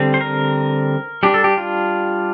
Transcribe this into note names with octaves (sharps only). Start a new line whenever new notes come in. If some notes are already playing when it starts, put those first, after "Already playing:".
Already playing: D3 G3 C4
C5
A#4
G3 D4 G4
A4
G4
F4